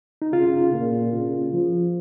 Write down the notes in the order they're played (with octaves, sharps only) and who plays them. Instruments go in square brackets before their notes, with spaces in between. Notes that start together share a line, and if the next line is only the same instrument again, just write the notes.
[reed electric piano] D#4
[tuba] C#3 [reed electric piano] F4
[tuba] A#2
C#3
F3